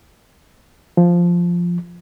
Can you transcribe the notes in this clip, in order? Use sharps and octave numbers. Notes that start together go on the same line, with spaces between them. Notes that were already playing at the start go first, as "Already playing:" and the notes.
F3